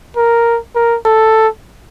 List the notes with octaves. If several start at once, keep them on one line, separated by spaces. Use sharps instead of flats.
A#4
A#4
A4